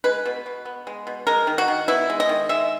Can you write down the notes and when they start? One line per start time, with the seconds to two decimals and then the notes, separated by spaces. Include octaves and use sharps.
0.04 G#3 B4
0.26 B2
0.46 B2
0.65 B3
0.87 G#3
1.07 B2
1.27 G#3 A#4
1.47 D#3
1.58 F#4
1.68 D#3
1.88 B3 E4
2.10 G#3
2.20 D#5
2.29 D#3
2.49 G#3 E5